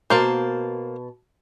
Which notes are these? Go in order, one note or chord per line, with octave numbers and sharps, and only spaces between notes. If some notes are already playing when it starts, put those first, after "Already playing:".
B2 A#3 C5 A5